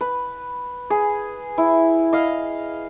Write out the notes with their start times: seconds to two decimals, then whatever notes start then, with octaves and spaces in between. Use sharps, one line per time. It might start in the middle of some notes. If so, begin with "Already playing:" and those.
0.01 B4
0.90 G#4
1.58 E4
2.13 D#5 F5